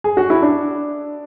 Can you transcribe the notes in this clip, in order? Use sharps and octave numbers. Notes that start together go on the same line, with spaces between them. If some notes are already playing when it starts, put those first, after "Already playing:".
G#4
F#4
E4
D4